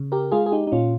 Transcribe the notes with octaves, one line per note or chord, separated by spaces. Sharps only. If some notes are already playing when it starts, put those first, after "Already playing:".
Already playing: C#3
G4 A#4
G#3 F4 G#4
G#4
D#4 G4
D#4
A#2 C#4 F4